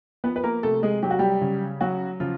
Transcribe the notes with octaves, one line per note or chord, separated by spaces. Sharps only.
F3 B3 B4
B4
A#3 A#4
C3 A3 A4
G#3 G#4
F#3 G4
F#4
G3 G4
C#3
F#3 F#4
C#3 F3 F4